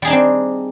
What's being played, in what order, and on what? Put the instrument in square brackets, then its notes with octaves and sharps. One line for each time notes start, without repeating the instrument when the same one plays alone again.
[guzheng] G3
G#4
D#4
D4
C4